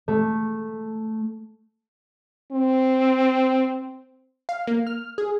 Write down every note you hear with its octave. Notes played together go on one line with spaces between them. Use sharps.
A3
C4
F5
A#3
F6
G#4